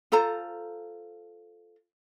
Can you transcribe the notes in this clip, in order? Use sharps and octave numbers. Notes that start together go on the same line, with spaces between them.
F4 A4 C5 A#5